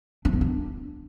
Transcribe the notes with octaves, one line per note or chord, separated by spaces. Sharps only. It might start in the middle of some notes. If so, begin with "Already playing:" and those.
D4
B3
D4